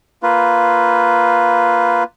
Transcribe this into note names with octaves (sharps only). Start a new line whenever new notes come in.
A#3 F4 B4